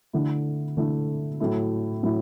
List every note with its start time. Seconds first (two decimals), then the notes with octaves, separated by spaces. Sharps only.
0.13 D3 A3 E4
0.77 D3 A3 E4
1.40 A2 F#3 A3 E4
2.03 A2 F#3 A3 E4